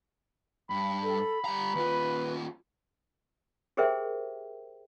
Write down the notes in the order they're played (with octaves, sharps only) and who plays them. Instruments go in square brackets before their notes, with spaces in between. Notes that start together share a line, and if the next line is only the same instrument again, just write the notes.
[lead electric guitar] G2 [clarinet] B5
[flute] A4
[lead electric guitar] G3 A#5 [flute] G4
[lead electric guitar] D#2 F4 [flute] B4
[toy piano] G4 G#4 A#4 C5 E5 G5